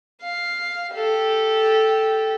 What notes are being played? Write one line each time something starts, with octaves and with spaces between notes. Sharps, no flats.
F5
G4 A4